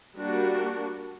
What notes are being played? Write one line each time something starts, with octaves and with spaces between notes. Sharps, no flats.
G3 A#3 D4 F#4